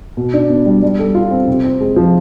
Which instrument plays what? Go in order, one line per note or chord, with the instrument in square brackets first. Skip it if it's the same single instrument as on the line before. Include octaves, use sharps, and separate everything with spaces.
[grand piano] B2
D4
B3
G3
G3
A4
F4
C4
C3
C4
G#3
F3